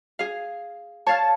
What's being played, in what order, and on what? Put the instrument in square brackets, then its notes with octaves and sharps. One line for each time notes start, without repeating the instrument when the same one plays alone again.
[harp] G#4 F5
[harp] C#5 F5 F6 [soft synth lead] A5